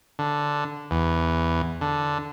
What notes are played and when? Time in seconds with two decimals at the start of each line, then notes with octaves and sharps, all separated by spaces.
0.19 D3
0.91 E2
1.81 D3